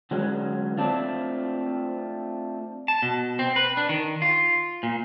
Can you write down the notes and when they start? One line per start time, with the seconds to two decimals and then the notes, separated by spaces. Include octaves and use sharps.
0.11 D3 F#3 G#3 C#4
0.77 A3 C4 D4 F4
2.88 A5
3.02 B2
3.39 C4
3.56 B4
3.77 D4
3.89 D#3
4.22 F4
4.83 A#2